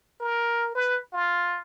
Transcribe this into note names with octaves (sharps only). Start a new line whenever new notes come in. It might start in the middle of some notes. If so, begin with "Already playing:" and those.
A#4
B4
F4